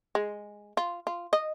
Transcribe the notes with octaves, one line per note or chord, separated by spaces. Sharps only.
G#3
F4
F4
D#5